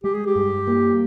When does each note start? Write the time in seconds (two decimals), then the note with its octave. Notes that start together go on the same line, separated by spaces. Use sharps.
0.04 G#3 G4
0.14 G#4
0.26 G4
0.35 G2
0.67 A#3